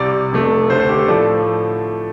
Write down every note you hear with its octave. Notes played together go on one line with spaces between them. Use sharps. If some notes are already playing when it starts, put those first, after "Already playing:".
Already playing: C2 C3 G3 D5
F1 F2 C3 A3
D2 D3 A3 C5
C5
G4
A4
A2 F3 A3 D5